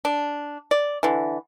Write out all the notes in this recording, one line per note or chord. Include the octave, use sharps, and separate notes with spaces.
D4
D5
D3 E3